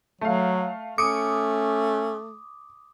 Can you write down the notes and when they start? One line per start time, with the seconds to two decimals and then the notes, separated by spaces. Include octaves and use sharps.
0.21 F#3 A3 F5
0.98 A3 C#4 D6 D#6 C#7